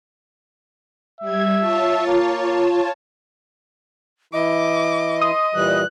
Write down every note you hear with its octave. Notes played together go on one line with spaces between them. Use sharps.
G3 E5 G#6
F4 C#5 A5
A#3
E3 E4 D#5 D6
C6 D#6
A#2 E3 G3 F#6